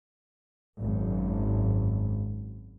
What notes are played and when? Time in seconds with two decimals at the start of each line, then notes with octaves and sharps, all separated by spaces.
0.80 G#1 F#2